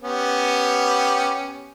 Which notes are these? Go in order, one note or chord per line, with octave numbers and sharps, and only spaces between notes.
B3 C#4 G4